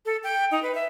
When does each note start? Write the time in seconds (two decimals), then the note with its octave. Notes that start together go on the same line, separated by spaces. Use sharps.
0.06 A4
0.24 G5
0.51 D#4
0.63 B4
0.75 E5